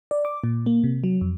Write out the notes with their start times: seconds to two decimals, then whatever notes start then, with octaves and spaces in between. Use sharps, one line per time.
0.11 D5
0.25 D6
0.44 A#2
0.66 A#3
0.84 C3
1.04 F#3
1.21 F2